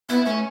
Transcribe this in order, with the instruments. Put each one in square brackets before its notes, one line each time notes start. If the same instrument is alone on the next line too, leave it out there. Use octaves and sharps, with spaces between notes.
[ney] B3 [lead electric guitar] E4
[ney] A3 [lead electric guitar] C#4